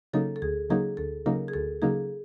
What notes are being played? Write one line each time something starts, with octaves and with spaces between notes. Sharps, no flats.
C#3 F#3 A#3 D#4 A4
A4
D2 G#4
C#3 F#3 A#3 D#4 G#4
D2 A4
C#3 F#3 A#3 D#4 A#4
G#4
D2 A4
C#3 F#3 A#3 D#4 G#4